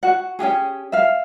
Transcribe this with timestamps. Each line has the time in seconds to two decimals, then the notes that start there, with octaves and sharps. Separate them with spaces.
0.03 F#4 F#5
0.39 C#4 F4 G4 G#4
0.92 E5 F5